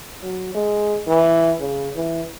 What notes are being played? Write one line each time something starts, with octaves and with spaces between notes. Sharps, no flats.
F#3
G#3
E3
C#3
E3